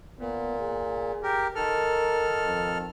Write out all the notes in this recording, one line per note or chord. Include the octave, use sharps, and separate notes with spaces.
A#2 B3
G#4
G4 A#4
D#3 A4 A#4 F6
F2